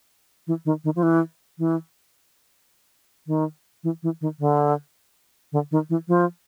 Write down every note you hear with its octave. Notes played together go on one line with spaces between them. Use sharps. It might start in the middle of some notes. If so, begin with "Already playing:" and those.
E3
D#3
D#3
F3
E3
E3
D#3
E3
E3
D#3
D3
D3
D#3
E3
F3